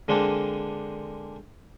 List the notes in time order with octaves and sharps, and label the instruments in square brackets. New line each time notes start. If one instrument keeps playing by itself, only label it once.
[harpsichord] D3 G#3 A#3 C4 D4 A4